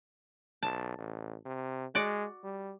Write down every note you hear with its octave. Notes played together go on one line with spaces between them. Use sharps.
B1 A5
A1
C3
G#3 F#4 D5
G3